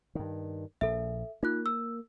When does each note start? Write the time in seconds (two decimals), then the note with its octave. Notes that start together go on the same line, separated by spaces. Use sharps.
0.15 G2 D#3
0.81 A#1 A4 E5
1.43 A#3 D#4 F4 F#6
1.66 E6